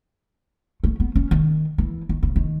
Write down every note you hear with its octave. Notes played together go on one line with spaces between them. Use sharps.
A3
B3
C#4
D#3
E3
D#3
C#3
D#3